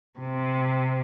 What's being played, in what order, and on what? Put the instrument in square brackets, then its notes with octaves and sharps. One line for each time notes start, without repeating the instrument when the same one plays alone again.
[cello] C3